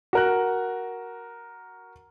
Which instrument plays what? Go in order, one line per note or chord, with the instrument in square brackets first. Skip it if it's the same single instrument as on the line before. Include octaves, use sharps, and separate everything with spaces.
[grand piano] F#4 A#4 F#6